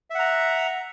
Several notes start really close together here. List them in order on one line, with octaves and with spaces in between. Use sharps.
E5 F#5 A#5